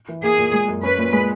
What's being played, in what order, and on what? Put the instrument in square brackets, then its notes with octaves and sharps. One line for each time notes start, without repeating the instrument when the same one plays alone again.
[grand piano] E3
[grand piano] A#3 [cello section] G#4
[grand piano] A#2
G#3
F#2
[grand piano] C#4 [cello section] B4
[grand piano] A#2
G#3